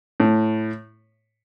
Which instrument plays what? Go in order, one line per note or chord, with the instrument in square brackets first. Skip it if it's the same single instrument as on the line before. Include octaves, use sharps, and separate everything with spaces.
[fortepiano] A2